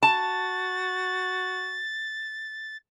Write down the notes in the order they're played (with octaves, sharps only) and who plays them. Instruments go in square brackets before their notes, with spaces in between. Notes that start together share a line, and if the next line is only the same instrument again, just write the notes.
[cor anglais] F#4 [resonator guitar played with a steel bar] A5 [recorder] A6